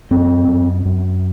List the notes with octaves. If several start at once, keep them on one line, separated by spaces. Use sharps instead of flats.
F#2 C4
F#2
F#2